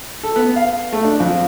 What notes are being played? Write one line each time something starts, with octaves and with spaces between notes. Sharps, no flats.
A4
B3
F5
A3
D4
F2